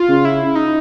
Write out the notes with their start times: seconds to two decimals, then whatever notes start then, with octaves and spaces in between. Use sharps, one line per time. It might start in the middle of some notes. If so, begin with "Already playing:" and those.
Already playing: F4
0.09 C#3
0.25 E4
0.55 D#4